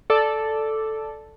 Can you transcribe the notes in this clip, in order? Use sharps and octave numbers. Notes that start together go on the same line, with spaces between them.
A4 D5